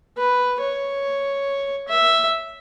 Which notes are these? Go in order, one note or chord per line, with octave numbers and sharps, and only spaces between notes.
B4
C#5
E5